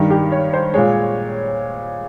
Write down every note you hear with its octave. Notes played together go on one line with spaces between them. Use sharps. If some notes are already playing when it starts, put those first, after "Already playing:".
Already playing: G2 D#3 G3
G4
C#5
C5
A#2 G#3 C#5